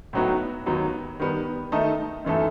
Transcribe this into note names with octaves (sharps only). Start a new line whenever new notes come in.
A2 F#3 B3 D#4 F#4
D#2 D#3 F#3 B3 D#4
D#3 G3 B3
D#3 A3 D#4 A4 D#5
F#2 E3 A3 D#4 A4